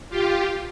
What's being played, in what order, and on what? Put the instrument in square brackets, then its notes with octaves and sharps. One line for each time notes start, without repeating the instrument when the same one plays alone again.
[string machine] F4 G4